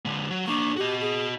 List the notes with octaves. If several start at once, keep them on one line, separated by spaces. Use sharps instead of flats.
D3 G#3
F#3
A#3 D4 C#6
F#4 G4 D#5
G#4